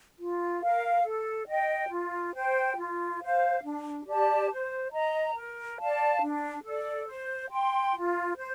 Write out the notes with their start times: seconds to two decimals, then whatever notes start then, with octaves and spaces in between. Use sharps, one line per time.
0.18 F4
0.61 A#4 F5
1.04 A4
1.47 D#5 G5
1.90 F4
2.33 C5 G5
2.76 F4
3.19 C5 F5
3.63 D4
4.06 G4 D5 A5
4.49 C5
4.92 D#5 A#5
5.35 A#4
5.78 D5 F5 A5
6.22 D4
6.64 A4 D5
7.08 C5
7.51 G5 C6
7.93 F4
8.37 C5